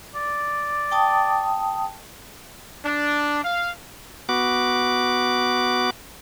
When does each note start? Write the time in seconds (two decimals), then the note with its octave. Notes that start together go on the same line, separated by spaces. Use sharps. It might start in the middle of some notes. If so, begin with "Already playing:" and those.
0.15 D5
0.91 G5 A5 D#6
2.85 D4
3.43 F5
4.29 B3 F#4 D6